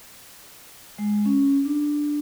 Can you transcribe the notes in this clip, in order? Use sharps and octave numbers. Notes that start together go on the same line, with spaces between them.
G#3
C#4
D4